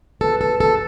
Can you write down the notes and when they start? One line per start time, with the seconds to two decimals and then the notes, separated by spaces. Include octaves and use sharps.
0.21 A4 B4
0.41 A4
0.60 A4